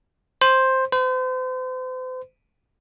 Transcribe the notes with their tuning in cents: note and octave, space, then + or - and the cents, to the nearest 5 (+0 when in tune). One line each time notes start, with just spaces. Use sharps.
C5 +5
C5 -40